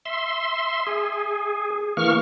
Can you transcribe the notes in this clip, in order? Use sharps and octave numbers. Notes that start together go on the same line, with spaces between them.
E5 C6
G#4
E3 A#3 C#6 F6